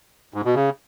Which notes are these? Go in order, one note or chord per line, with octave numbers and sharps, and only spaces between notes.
G#2
B2
C#3